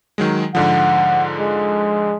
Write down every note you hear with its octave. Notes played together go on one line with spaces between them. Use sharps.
D#3 F#3 G#3
G#2 D3 F3 F#5
G#3